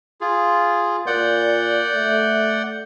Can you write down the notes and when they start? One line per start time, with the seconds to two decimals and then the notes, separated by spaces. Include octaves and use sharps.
0.21 F4 G#4
1.07 A#2 D5 F#5 G6
1.95 A3